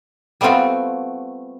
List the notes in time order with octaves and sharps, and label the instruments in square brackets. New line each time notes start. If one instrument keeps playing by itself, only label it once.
[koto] G3 A3 B3 C4 F4 F#4